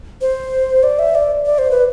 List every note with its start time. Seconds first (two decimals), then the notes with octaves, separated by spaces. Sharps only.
0.21 C5
0.83 D5
0.99 E5
1.15 D5
1.45 D5
1.58 C5
1.71 B4